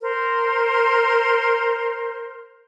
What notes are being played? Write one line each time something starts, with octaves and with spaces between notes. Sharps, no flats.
A#4 C5